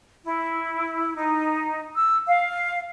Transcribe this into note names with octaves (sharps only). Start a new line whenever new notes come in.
E4
D#4
E6
F5